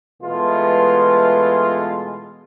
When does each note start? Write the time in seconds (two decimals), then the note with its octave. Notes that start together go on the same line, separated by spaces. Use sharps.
0.22 B2 E3 G#3 A3 F4